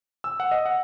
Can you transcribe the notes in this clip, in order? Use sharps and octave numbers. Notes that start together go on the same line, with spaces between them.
E6
F#5
D#5
F#5